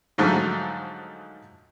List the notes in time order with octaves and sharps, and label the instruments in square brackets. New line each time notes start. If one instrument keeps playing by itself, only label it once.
[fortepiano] G#2 D3 F3 F#3 A3 D#4